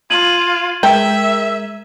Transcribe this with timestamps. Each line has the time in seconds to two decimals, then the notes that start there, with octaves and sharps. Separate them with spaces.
0.10 F4 G#6 D#7 F#7
0.83 G#3 A#4 E5 G5